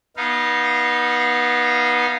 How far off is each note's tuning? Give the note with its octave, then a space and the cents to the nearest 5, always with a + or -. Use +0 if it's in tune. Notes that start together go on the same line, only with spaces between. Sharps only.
B3 -25 D#4 +0 F5 -15